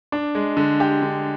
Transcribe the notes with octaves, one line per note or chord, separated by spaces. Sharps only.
D4
G#3
D3
G4
D3